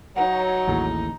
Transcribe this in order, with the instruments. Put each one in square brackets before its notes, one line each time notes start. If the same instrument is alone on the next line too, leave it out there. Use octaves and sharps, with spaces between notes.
[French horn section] F#3 [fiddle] D#4 [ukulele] B4 F5 F#5
[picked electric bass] A1 D#2 A2 [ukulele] G#4 A5